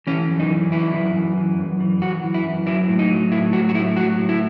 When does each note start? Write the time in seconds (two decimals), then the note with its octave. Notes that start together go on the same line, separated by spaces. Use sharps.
0.07 E3 C#4
0.29 F#2
0.40 D#4
0.50 E3
0.72 F#2 E4
0.94 E3
1.16 F#2
1.37 E3
1.59 F#2
1.80 E3
2.02 F#2 F#4
2.24 E3
2.34 E4
2.45 F#2
2.66 F#3 E4
2.88 A2
2.99 D#4
3.10 F#3
3.32 A2 E4
3.53 F#3 F#4
3.69 F#4
3.74 A2 E4
3.96 F#3 F#4
4.18 A2
4.29 E4